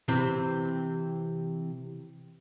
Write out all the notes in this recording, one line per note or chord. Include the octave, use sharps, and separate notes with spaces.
C3 E3 C4